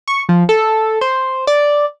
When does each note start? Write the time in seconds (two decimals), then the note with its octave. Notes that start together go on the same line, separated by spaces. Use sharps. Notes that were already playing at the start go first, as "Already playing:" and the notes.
0.08 C#6
0.29 F3
0.49 A4
1.01 C5
1.47 D5